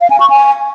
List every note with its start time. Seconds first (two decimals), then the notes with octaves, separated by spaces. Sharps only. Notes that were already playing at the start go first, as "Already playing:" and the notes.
0.01 F5
0.10 G#5
0.20 C#6
0.30 G#5